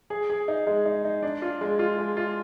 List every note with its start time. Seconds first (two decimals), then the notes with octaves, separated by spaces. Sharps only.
0.10 G#4
0.30 G#4
0.48 D#4
0.67 G#3
0.86 D#4
1.05 D#4
1.23 D4
1.42 F4
1.61 G#3
1.79 F4
1.98 G#3
2.17 F4